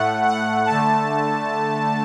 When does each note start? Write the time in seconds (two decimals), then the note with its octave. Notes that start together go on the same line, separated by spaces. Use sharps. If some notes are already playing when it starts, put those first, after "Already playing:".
Already playing: A2 A3 F#5
0.27 F#5
0.66 D3 A3 A5